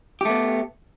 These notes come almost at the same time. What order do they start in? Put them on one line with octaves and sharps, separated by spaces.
G4 A3 B3